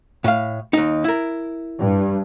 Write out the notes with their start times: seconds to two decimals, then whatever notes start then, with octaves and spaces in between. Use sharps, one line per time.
0.24 A2 F5
0.73 D#2 D#4
1.04 E4 A#4
1.79 G2